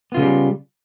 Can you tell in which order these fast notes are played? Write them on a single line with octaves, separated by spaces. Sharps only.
B3 F4 C#3 G#3 G3